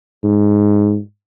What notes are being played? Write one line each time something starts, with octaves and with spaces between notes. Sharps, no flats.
G#2